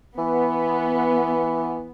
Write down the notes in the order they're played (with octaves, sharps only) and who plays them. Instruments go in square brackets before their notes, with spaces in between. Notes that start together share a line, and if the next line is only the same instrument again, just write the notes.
[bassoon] E3 [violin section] B3